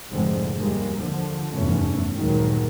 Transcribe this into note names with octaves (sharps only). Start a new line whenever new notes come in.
F1 G#2 D3 G#3 C4
D#2 G3 G#3 A#3
D3 F3
F1 E2 G2 E3 A3 C#4
D2 G2 A#2 D#3 F#3 G#3